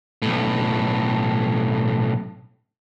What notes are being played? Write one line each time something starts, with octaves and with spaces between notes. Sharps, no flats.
B1 A2